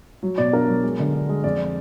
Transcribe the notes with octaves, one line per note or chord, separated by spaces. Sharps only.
F#3
B2 D5
D4 A#4
F#3
G#3
D3
D4
G#3
F2 D5